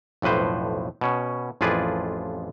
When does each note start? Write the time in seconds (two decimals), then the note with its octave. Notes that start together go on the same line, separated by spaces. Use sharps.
0.22 B1 F2 A2 B4 C5
1.01 B2 C#4
1.61 A1 F2 F4 G#4 B4 D5